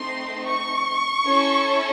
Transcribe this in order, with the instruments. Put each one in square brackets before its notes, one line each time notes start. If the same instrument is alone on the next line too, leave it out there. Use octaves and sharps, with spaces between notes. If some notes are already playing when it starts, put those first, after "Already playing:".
Already playing: [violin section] A3 C4 D#4 C6
C#6
C#4 E4 A4